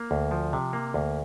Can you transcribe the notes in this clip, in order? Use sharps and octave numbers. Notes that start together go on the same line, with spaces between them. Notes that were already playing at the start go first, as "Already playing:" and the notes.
Already playing: A#3
D2
F3
C3
A#3
D2